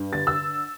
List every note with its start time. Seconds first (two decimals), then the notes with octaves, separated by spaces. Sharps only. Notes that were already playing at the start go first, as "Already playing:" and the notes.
Already playing: G2
0.13 D3 A6
0.27 E6